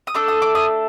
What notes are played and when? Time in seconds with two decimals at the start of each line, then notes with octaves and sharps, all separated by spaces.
0.07 D#6
0.15 A3 D4 A4 D6
0.28 D#6
0.42 D6
0.55 D#6